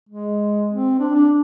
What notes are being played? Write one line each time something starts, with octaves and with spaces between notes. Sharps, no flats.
G#3
C4
D4
D4